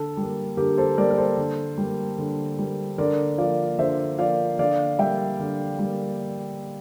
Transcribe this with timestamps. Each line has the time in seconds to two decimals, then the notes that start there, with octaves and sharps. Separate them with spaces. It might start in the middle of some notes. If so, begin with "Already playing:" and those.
Already playing: D3 A4
0.17 G3 A#3
0.57 D3 G4 A#4
0.77 A4 C5
0.97 G3 A#3 A#4 D5
1.10 A#4
1.18 A4 C5
1.37 D3
1.78 G3 A#3
2.18 D3
2.59 G3 A#3
2.98 D3 A#4 D5
3.38 F3 A#3 D5 F5
3.79 D3 C5 E5
4.19 F3 A#3 D5 F5
4.59 D3 D5 F5
4.99 G3 A#3 E5 G5
5.39 D3
5.79 G3 A#3